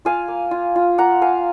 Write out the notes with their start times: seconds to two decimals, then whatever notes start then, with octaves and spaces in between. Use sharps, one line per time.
0.05 F4 F5 G#5
0.28 A#3
0.51 F4
0.76 F4
0.98 A#3 F#5 A#5
1.21 F4 F5 G#5